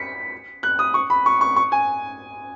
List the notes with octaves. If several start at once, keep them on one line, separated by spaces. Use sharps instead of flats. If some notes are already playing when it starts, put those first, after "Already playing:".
Already playing: B6 C#7
F#6
D#6
C#6
B5
C#6
C#6
C#6
G#5